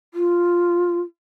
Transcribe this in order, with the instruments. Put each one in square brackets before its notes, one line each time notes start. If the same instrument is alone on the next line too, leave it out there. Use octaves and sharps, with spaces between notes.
[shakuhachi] F4